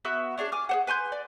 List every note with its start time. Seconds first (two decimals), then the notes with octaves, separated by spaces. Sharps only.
0.05 B3 F#4 E5 E6
0.38 C#4 D4 G#4 D5
0.52 G#5 D6 F6
0.69 G#4 C5 F#5
0.87 B4 G#5 C6 G6
1.12 D5